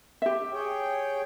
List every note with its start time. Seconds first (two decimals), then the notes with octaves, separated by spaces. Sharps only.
0.22 G4 E5
0.52 G#4 C#5 G5